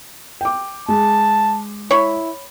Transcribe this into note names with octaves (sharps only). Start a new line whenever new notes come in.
G5 D6
G#3 A5
E4 C#5 B5